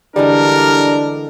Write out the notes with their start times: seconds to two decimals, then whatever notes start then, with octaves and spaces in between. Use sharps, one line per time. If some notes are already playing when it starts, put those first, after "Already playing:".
0.16 D3 E3 G3 G#3 D4 A#4